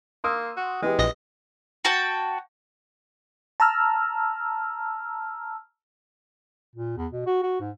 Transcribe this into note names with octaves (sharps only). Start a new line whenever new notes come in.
A#3 C6 D#6 E6
F#4
E3 G#3 B3 G4
A#1 D#5 A#6
F#4 F#5 G5 A5
A5 A#5 E6 F6
A#2
E2
B2
F#4
F#4
G#2